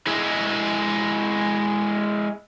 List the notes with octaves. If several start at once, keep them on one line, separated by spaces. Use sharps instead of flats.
G#3 E4